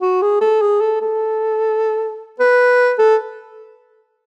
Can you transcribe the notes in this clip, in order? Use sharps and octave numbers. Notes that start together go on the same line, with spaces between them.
F#4
G#4
A4
G#4
A4
A4
B4
A4